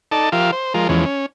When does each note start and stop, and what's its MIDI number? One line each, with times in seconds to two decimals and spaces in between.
0.12 0.29 63
0.12 0.29 69
0.12 0.29 74
0.12 0.29 81
0.32 0.51 53
0.32 0.51 65
0.32 0.51 67
0.32 0.51 70
0.32 0.51 76
0.32 0.51 77
0.52 0.73 72
0.74 0.88 53
0.74 0.88 56
0.74 0.88 65
0.74 0.88 70
0.89 1.05 40
0.89 1.05 52
0.89 1.05 53
0.89 1.05 56
0.89 1.05 61
1.05 1.26 61